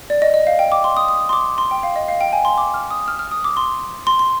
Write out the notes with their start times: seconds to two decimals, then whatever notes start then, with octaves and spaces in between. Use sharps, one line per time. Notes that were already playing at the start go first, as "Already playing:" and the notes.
0.10 D5
0.22 D#5
0.34 D#5
0.47 F5
0.59 G5
0.72 D6
0.84 C6
0.97 D#6
1.08 D#6
1.29 C6
1.33 D6
1.58 C6
1.71 G5
1.83 F5
1.96 D#5
2.08 F5
2.21 G5
2.33 G#5
2.45 C6
2.58 D6
2.74 F6
2.91 D#6
3.08 F6
3.19 F6
3.31 D#6
3.44 D6
3.57 C6
4.07 C6
4.19 C6